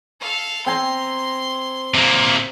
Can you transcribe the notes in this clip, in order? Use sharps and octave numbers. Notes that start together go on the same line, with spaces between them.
A4 F5
C4 G#5 A#5 C6
C3 A#3